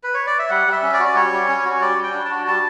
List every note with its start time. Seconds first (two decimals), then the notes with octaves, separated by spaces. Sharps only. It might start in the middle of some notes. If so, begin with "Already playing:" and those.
0.04 B4
0.14 C#5
0.27 D5
0.39 E5
0.50 G3 F#5
0.67 G3
0.72 E5
0.82 C#4
0.93 D5
1.00 F#4
1.05 D5
1.15 G3 C#5
1.33 G3
1.48 C#4
1.65 F#4 C#5
1.81 G3 D5
1.98 G3
2.03 G5
2.14 D4
2.25 A5
2.30 F#4
2.47 G3 A5